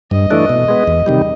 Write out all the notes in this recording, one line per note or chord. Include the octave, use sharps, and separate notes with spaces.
G2 D#5
E3 A3 D4
B2
G#3 B3
E2
C3 D#3 G3